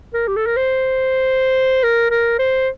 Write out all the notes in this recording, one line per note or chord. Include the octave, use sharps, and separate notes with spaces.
A#4
G4
A4
A#4
C5
A#4
A#4
C5